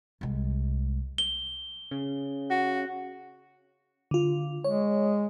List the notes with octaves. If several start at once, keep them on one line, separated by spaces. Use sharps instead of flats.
C2 G#3
G7
C#3
F#4
D3 F4
G#3 C#5